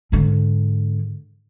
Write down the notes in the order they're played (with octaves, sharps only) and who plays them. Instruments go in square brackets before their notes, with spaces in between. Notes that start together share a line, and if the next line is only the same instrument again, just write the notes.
[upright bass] G#2 D3